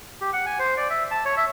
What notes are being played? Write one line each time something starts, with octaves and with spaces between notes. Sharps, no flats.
G4
F#5
G#5
C5
D5
E5
A5
C#5
E5